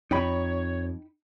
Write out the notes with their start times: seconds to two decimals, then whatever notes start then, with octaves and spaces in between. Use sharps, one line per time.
0.11 F2 D#4 C#5 G5 B5